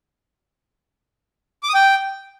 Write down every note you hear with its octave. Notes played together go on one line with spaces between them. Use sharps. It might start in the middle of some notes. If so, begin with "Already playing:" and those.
D6
D#6
G5